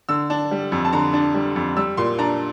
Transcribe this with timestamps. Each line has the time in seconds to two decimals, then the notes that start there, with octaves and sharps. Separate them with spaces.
0.09 D3 E6
0.30 D4
0.51 G3
0.72 F2
0.85 A5
0.93 D3 A#5
1.13 D4
1.34 G3
1.56 F2
1.76 G3 E6
1.97 A#2 C6
2.19 D4 A#5